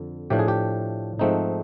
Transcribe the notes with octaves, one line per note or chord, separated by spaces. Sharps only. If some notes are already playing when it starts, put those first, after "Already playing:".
Already playing: F2 D3
A2 F3 A3 D4 G4
G#4
G4
G#2 F3 A3 C4 D#4